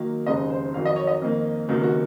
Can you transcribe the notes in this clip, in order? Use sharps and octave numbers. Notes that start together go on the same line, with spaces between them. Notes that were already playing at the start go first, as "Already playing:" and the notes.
Already playing: D#3 F#3 A#3
F1 D#2 C#3 G#3 D#5
C5
F2 D#3 F#3 F5
D#5
C#5
D#5
F2 D#3 A#3
C#2 C3 D#3 F#3 A#3
F#4